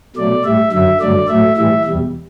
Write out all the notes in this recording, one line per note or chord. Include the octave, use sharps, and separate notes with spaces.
B2 F#3 A3 D5
A2 G3 E5
F#2 D3 F#3 E5
G2 D3 F#3 A3 D5
A2 F#3 A3 E5
A2 E3 G3 E5
E2 B2 G3